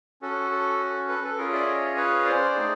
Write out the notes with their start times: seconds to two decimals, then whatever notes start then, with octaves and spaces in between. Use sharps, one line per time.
0.22 C#4 F#4 A4
0.51 A4
1.08 A4 B4
1.24 A4
1.38 C#4 F4 G#4 A#4
1.53 D5 E5
1.67 C#5 D#5
1.97 B4 C#5
2.25 C5 D5
2.55 A3 C4 D#4 G#4